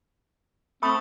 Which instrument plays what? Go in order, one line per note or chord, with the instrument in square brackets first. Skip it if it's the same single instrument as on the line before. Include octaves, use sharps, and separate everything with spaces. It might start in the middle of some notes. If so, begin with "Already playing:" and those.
[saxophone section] A3 [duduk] C4 [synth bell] B5 D#6